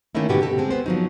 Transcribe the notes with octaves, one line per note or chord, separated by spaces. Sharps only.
D#3 A3 A#3 C#4 D#4 E4
G#2 B2 D3 B3 F#4 G4
B2 G4 A4
G#3 C4
B3 C5
F3 F#3 D#4